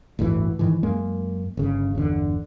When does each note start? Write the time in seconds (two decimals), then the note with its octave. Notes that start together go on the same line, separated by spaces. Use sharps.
0.19 G1 D2 A2 E3
0.59 G#2 D#3 E3
0.83 F#2 G#3 A#3
1.57 G1 C#3
1.95 G1 E2 B2 D3